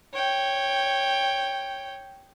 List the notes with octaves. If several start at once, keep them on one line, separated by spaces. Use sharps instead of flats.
C#5 G5